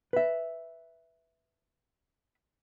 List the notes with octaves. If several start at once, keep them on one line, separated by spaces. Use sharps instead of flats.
B4 E5